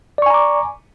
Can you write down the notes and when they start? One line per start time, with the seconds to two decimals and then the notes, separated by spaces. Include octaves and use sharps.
0.18 D5
0.22 C#6
0.26 G#5
0.30 A#5
0.34 D6